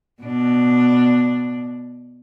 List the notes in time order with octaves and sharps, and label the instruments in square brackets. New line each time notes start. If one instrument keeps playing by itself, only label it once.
[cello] B2 D4